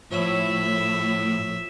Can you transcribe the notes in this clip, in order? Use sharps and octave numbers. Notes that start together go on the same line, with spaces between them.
A2 F3 C#5 E5